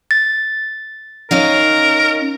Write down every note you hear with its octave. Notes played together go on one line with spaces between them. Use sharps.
A6
C#4 D#4 A#4 F5